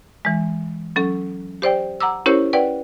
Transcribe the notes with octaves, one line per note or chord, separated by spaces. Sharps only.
E3 G#3
F#3 C#4 A4
G4 C5 D5 G5
F#5 A#5 D6 E6
C#4 E4 G4 A#4 C5 C#5
B4 D5 F#5 G5